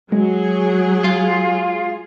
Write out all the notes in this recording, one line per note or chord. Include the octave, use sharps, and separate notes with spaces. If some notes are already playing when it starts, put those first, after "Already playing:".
F#3 G#3 G#4
F4